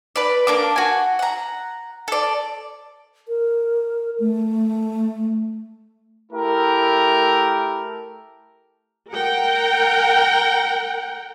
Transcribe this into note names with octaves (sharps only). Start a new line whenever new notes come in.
B4 D5
A#3 D4 D6
F#4 G#5
F#5 A#5
A4 D5
A#4
A3
A3 E4 G4 A#4
A#4 F#5 G5